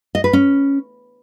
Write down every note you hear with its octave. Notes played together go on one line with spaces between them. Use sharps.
D#5
B4
C#4